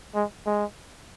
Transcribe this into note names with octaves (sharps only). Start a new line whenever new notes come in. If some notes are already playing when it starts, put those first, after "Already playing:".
G#3
G#3